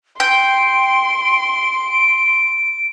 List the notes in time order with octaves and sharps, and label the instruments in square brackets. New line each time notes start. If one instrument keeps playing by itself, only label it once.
[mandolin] G5 [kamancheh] C6 [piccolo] D7